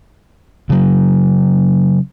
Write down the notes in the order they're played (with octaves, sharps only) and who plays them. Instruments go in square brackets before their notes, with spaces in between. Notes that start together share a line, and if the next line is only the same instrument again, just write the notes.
[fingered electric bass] C#3 F#3